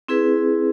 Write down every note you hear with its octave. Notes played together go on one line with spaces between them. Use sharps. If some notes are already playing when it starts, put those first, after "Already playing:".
C4 E4 G#4 B4